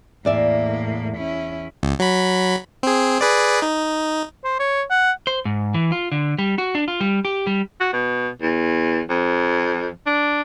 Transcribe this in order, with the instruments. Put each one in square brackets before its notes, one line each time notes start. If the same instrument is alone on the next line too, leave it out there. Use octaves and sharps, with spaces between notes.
[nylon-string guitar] E2 D5 E5 [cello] A2 A#3
[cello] C#4 E4
[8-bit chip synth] C#2
F#3 B5
C4 G#4
G#4 B4 D5
D#4
[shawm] C5
C#5
F#5
[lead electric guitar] C5
G#2
E3
F4
D3
G3
F#4
D4
F4
G3
G4
G3
[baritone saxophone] F#4
B2
E2
F2
D4